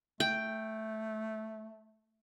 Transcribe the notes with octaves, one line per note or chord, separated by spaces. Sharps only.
A3 G5